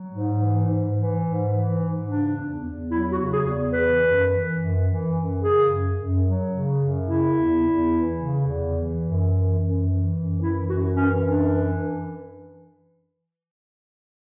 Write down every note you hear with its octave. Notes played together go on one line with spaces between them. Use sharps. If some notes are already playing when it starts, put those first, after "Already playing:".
Already playing: F#3
G#2
E3
G#2
E3
G#2
E3
G#2
C#3 D4
E2
E2
F#3 E4
F#4
C#3
G#4
E2
E3 B4
F#2
E3
F#2
E3
F#2
C#3 G#4
F#2
F#2
F#3
C#3
F#2
C#3 E4
E2
E2
E3
C#3
E2
E3
F#2
E3
F#2
E3
F#2
E3 E4
F#2 F#4
E3 C#4
F#2 D4
E3